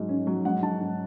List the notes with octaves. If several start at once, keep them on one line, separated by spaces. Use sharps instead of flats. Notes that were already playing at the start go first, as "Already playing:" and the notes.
Already playing: G#2 F#3
C#4
F#3
G#2 F#5
G#2 A5
G#2